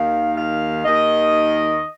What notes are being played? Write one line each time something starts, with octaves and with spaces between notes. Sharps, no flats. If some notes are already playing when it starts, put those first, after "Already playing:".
Already playing: D#2 D#3 F5
F5
D#2 D#3 D#5